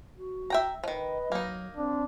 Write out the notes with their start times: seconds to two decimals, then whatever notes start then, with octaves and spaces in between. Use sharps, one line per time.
0.18 F#4
0.50 E5 G5 A#5
0.84 D#3 F3 B4 D#5
1.32 F#3 A#3 D#4
1.77 C4 D4